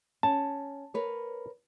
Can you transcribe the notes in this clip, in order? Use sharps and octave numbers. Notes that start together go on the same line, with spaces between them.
C#4 A5
A#4 B4 C#5